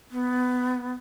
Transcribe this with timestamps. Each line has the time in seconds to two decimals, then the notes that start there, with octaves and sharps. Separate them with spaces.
0.11 B3